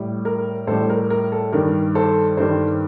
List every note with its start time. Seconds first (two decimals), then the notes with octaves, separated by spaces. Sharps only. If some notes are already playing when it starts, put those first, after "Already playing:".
Already playing: A2 G3
0.25 A#4
0.67 A2 G3 A4 C5
0.90 A#4
1.10 A#4
1.32 A4
1.53 G2 D#3 G3 A#4
1.95 A4 C5
2.37 G2 D#3 G3 A4 C5